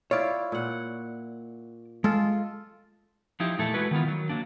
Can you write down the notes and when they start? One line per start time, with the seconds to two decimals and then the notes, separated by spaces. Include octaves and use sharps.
0.11 E4 F4 C#5 D5
0.52 A#2 F#5
2.04 G#3 F4 A4
3.40 F3 D#4 E4 G4
3.58 E2 A#2 A3 E4 A4
3.74 G#3 A3 E4 F#4 B4
3.91 D#3 B3 E4 F4
4.05 D#3 F#3
4.29 D#3 E3 F#3 A#3 D4